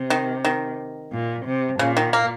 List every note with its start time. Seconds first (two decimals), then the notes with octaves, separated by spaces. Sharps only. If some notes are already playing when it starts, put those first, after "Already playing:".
Already playing: C3
0.10 D#3
0.45 D#3
1.12 A#2
1.46 C3
1.79 A#2 C#3
1.97 D#3
2.13 A#3